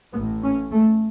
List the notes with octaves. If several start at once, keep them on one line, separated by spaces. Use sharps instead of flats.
A1 A2 B3
C#4
A3